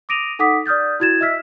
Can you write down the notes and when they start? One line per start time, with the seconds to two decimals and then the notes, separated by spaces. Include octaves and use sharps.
0.09 D6 D#6 A#6 D7 D#7 F7
0.39 D#4 A4 F#5 D6 D#6 B6
0.66 D5 D#6 F6 G6 A6
1.00 E4 F#4 G#6 A6 E7
1.21 D#5 E5 E6 F6 B6